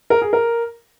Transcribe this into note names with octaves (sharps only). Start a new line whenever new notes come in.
A#4
G#4
A#4